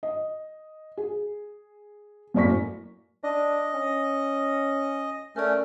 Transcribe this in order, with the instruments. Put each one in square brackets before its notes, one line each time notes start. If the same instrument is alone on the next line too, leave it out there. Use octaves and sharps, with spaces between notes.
[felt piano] D#5
G#4
F#2 A2 A#3 D5 C#6 B6
[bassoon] D4 [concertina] D#5
[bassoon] C#4
[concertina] A3 C#4 [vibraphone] A#4 D5